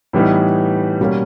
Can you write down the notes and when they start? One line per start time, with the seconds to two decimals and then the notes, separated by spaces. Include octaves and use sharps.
0.13 A2 E3 G3 B3 D#4
1.00 B2 G3 A#3 C#4